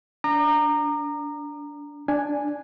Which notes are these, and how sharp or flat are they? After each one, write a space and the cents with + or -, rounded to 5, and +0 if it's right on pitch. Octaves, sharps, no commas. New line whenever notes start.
D4 -20 A#5 -10 D6 +45
D4 +0 G#5 +0